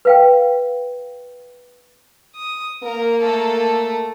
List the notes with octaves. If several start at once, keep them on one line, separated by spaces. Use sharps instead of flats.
B4 F5 G5
D#6
A#3 A#4
A3 A4